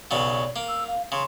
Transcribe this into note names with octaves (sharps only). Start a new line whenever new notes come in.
B1 C#3 F#3 D5
A#3
E6
F5
C#3 C6